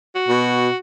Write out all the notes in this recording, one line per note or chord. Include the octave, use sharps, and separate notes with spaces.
F#4
B2